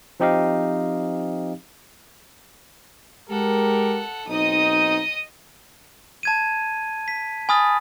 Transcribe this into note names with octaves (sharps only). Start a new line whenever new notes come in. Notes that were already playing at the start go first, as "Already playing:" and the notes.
F3 C4 D#4 G4 D#5 F5
G#3 G4 A4 A#4 F#5
B1 C4 D#4 D#5 D#6
A5 G#6 D#7
B6
G#5 B5 D#6 F6 A6